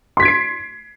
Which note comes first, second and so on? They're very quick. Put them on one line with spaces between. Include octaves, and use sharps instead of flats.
C6 B6 G#6 D7 C7